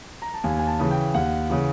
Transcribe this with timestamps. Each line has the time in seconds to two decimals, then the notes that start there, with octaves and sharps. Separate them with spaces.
0.22 A#5
0.34 A5
0.44 D#2 G#5
0.59 G#5
0.67 A5
0.79 C#3 E3
0.91 G5
1.14 D#2 F#5
1.50 C#3 E3